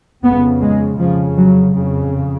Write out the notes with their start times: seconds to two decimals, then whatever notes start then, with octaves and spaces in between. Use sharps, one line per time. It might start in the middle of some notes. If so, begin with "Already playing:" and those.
0.24 F2 C#3 B3
0.61 G#3
0.99 F2 C#3 F3
1.37 F#3
1.76 F2 C#3